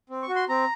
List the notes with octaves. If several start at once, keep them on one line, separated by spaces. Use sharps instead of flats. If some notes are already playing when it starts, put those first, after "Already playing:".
C4
C#6
F#4
C6
C4 A#5